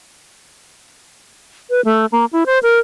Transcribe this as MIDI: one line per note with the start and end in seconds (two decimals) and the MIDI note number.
1.70 1.81 71
1.85 2.06 57
2.12 2.25 58
2.33 2.44 64
2.46 2.59 72
2.63 2.79 70